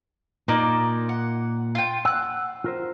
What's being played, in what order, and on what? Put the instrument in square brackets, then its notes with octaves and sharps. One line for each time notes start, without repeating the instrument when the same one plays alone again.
[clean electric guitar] A#2 [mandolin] A#3 D#4 D5
[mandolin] F#5
F4 G5
[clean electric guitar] F#5 [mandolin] E6 F#6
[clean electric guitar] F4 A#4 C5